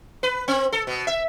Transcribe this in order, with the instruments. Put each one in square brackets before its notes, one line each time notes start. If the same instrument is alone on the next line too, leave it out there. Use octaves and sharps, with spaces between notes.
[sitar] B4
C4
A4
B2
E5